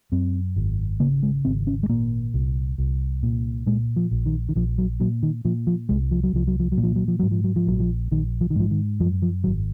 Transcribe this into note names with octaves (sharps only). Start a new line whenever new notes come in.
F#2 C4
G#1
C#3 A#3
G#3
G#1 C4
C#4
G#3
A#2 A#3
C2
C2
A#2
A#2 G#3
F3
A#1
D#3
D#3
A#1 F3
F#3
A#2 F#3
D#3
A#2 F3
F3
C2 G#3
F3
F#3
C2 F3
F#3
F3
F#3
A#2
F3
F#3
F3
G#2 F#3
F3
F#3
F3
A#1 F#3
F3
A#1 D#3
F3
D#3
G#2 F3
D#3
F#2 F3
F3
G#1 F#3